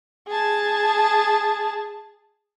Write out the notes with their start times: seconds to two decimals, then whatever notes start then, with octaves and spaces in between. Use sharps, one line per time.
0.28 G#4 A5